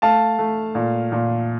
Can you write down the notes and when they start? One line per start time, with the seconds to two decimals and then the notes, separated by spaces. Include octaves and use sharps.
0.02 A3 F5 A5
0.39 A3
0.75 A#2
1.12 A#2